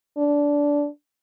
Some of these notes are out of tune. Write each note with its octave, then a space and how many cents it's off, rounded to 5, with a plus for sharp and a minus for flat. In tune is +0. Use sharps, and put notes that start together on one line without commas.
D4 -15